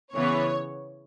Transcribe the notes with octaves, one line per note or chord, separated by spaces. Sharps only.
C#3 E3 B3 C#5